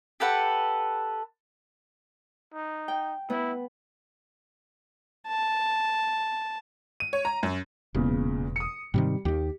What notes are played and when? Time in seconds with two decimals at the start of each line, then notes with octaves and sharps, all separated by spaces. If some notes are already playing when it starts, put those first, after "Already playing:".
0.20 G4 A4 B4 F#5
2.54 D#4
2.88 G5
3.30 B3 E4
5.28 A5
7.00 D#7
7.13 C#5
7.25 A#5
7.43 F#2
7.95 E1 E2 A#2 C#3
8.56 D#6 C#7
8.94 G#2 C3 D#3 G3
9.25 D#2 D#3 G4